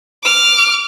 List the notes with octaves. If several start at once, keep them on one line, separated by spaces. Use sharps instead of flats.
D6 F6